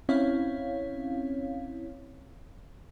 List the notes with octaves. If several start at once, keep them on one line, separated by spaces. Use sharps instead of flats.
C4 C#4 E4 C#5 F5